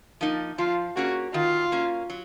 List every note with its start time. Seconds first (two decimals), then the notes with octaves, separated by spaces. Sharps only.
0.21 F3 A#3 D#4
0.58 F3 F4
0.97 A#3 C#4 F#4 G#4
1.34 D#3 F4
1.72 A#3 C#4
2.10 F#3